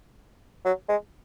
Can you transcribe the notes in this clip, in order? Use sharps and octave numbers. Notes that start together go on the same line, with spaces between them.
F#3
G#3